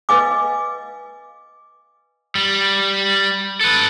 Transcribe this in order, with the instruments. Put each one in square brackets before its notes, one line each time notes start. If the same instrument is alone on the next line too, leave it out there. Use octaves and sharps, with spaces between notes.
[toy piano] B4 D#5 F5 G#5 D6
[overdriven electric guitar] G3
A4 B4